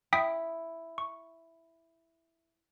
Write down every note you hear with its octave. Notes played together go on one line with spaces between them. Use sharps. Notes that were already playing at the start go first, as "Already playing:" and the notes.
E4 G5 D#6 B6
C#6